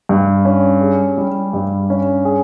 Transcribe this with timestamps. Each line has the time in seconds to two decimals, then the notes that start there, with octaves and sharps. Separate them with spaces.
0.09 G2
0.45 C#4
0.81 G#4
1.18 G3
1.53 G2
1.90 C#4
2.25 G#4